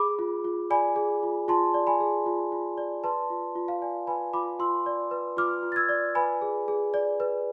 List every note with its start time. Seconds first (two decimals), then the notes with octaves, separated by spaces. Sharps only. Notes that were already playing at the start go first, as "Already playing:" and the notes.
Already playing: G#4 B5 D6
0.19 F4
0.44 F4
0.70 D5 G#5 B5
0.96 G#4
1.23 F4
1.48 F4 A5 C6
1.74 D5
1.87 G#5 B5
2.00 G#4
2.26 F4
2.52 F4
2.78 D5
3.04 B4 A5 C6
3.30 F4
3.55 F4
3.68 F5
3.82 D5 G#5
4.07 B4 G#5 B5
4.33 F4 B5 D6
4.59 F4 C6 E6
4.86 D5
5.11 B4
5.37 F4 D6 F6
5.63 F4
5.72 A6
5.76 E6 G#6
5.89 D5
6.15 B4 G#5 B5
6.42 G#4
6.68 G#4
6.94 D5
7.20 B4